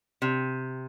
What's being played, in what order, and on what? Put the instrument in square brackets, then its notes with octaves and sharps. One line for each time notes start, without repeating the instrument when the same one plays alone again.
[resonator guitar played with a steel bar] C3